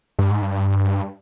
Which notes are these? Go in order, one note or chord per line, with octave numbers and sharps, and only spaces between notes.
G2
G#2
G2